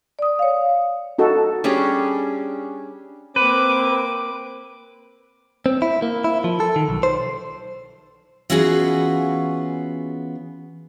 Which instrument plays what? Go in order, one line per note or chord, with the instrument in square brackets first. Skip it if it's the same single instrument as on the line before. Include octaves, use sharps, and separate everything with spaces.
[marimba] D5 D#6
C#5 F5
[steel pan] D#4 F#4 A4
[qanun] G3 C#4 D4 G#4
[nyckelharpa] A#3 D6 [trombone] C4 [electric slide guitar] B4
[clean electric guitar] C4
E4
A#3
E4
F3
A4
D#3
B1
C5
[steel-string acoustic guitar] E3 B3 C#4 F4 F#4 G#4